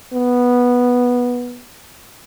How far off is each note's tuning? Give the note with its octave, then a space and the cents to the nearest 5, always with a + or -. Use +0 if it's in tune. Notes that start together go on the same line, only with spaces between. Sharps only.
B3 -10